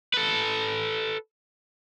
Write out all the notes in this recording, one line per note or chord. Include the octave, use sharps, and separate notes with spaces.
A4 B4